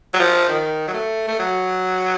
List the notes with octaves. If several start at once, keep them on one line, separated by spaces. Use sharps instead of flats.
F#3
F3
D#3
F#3
A3
A3
F#3